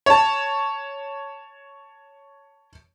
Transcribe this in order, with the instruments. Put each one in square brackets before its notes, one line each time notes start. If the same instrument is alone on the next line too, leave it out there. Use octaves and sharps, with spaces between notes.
[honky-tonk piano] C#5 A5